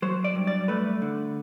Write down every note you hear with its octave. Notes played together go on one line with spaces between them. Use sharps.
F#3 C5
D5
G2
D5
A3 B4
D3